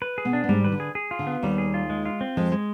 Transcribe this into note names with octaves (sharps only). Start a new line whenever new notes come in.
B4
G#4
B2 B3
D4
B3
G#2 G3 G#3
D#3 B4
D3
G#4
G#4
F4
D3
B3
D#2 D#3 G3
G#4
F4
G#3
F4
C4
F2 F3 G#3
G#3